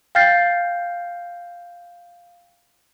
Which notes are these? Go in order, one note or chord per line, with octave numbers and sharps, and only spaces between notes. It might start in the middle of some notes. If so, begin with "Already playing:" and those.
F5 G5 F6 G6 A6 C7